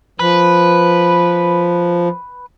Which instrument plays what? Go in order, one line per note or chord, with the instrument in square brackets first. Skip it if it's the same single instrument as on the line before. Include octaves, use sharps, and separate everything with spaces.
[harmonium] F3 [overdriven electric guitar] B4